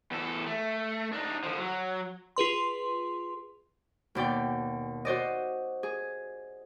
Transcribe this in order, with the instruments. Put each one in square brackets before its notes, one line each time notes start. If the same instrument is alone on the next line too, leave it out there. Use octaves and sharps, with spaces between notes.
[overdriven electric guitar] E2 A4
A3
D4 D#4
D3 F3
F#3
[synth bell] F4 G#4 B4 C6
[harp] D#2 B2 D5 G5
F#4 C5 D5 D#5
G#4